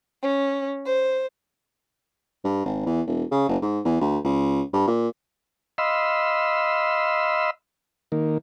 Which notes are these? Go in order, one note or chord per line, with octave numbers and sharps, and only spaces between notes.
C#4
C5
G2
G#1
E2
E1
C#3
F#1
G#2
E2
D2
C#2
G2
A#2
D#5 F5 B5 C6 E6
D#3 A#3